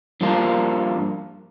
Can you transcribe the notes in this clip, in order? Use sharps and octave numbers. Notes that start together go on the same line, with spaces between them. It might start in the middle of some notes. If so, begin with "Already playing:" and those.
G2 F3 A#3 D4 F4